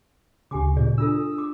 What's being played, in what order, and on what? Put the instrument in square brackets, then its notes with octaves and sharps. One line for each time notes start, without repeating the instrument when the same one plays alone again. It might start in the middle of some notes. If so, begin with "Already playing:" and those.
[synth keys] D2 C#3 [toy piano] G4 G#5 D6
[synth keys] A#2 C#3 [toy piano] G#4 D5
[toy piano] D4 F4 A4 [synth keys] D#6 E6
[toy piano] D6